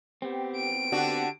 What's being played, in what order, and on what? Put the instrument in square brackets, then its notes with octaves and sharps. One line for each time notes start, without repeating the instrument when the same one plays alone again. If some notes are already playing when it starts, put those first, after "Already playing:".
[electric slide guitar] B3 C4 [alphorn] G4
[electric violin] D7
[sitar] D3 D4 F#4 [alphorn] G4